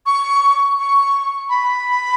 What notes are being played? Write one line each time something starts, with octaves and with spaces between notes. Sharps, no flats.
C#6
C#6
B5